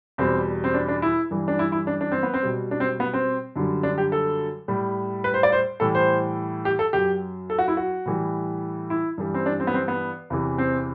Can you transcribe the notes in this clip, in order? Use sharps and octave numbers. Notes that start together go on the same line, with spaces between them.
E2 B2 G3 C4
C4
D4
D4
E4
G2 E3 G3
D4
E4
E4
D4
D4
C4
B3
C4
B2 G3
D4
C4
B3
C4
F#2 D3 G3
D4
G4
A4
A2 G3
B4
C5
D5
C5
A2 E3 G3 A4
C5
G4
A4
F#2 F#3 G4
A4
F#4
E4
F#4
A2 E3 G3
E4
G2 E3 G3
C4
D4
C4
B3
C4
B3
E2 C3 E3
C4